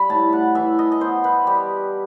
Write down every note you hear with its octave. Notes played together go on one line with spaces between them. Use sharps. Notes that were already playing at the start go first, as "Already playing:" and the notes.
Already playing: G3 B5
A2 A5
F#5
E3 E5
D#5
D#5
B3 C5
B4
G3 G4